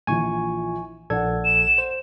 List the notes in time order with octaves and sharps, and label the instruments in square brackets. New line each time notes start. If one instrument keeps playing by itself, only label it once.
[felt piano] A#1 E3 F3 [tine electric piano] G#5 C#6
[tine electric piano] A#1 A4 G#6 [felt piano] D5 F#5
[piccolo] E7
[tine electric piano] C5